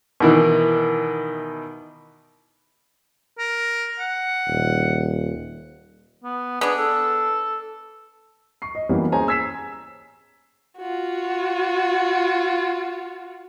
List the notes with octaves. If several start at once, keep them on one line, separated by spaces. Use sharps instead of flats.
B2 D#3 E3
A#4
F#5
D#1
B3
B3 D4 G#4
A4
C#6 C7
D#5
F#2 E3 G3 A#3 B3 C#4
C#4 G#4 C5 C#5 G#5 A#5
E6 G#6 B6 C7 E7
F4 F#4